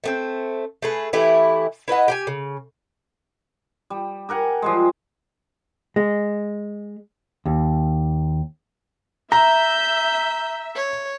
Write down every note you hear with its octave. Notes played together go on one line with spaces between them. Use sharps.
A3 B3 C4
A3 G#4 B4
E3 A3 E4 G4
E4 B4 D#5 F#5
G4 F#5 G#5
C#3
G3
G4 A#4 F#5 G#5
F3 G3 G#3
G#3
D#2
E5 A#5 G6
C#5